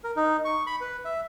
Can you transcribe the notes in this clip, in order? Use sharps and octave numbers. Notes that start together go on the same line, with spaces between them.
A#4
D#4
C#6
B5
B4
E5